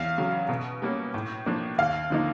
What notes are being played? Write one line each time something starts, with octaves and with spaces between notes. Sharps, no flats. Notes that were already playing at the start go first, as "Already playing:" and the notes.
Already playing: E2 F5
C#3 F#3
B2
G3 A#3 C#4
A2
F3 A#3 D4
D#2 F5
D3 F3 A#3 D#4